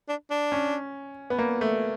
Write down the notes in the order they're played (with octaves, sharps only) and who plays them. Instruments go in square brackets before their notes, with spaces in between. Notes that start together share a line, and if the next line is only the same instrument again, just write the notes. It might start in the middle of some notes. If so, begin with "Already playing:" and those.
[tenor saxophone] D4
D4
[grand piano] C#4
B3
A#3
A3